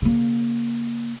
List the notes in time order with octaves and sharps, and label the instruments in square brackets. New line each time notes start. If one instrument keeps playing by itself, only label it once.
[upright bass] C#3 A#3